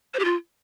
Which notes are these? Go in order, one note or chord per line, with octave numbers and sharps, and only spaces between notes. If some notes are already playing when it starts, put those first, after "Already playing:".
C5
G4
F4